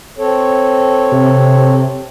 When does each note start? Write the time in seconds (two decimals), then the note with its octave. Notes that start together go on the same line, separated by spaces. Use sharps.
0.19 C4 A4 C#5
1.12 C3